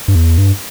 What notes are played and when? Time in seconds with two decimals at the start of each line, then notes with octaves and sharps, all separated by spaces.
0.08 G2
0.15 E2
0.38 G2